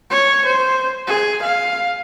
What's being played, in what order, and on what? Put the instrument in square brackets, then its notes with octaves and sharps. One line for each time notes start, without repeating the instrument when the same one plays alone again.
[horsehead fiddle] C#5
C5
G#4
F5